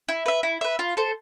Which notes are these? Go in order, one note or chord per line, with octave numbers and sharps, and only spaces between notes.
E4
B4 E5
E4
B4 E5
F4
A4 C5